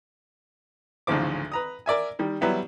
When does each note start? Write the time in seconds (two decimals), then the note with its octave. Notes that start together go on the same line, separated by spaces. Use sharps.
1.07 A1 D2 G#2 C#3 F3 D6
1.52 B4 A#5 D#6
1.86 A#4 D5 E5 G#5
2.19 D#3 G3
2.41 F#3 G3 B3 E4